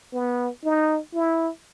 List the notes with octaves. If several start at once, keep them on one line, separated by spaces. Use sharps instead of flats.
B3
D#4
E4